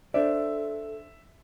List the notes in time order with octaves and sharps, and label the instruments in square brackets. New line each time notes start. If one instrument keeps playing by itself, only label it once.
[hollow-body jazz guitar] D4 C5 D5 [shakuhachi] A4 [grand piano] E5